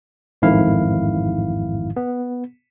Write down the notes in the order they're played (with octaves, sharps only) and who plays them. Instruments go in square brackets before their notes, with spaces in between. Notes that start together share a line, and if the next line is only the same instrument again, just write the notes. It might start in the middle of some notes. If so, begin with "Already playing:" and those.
[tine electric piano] A1 F2 G#2 D#3 E4 F5
B3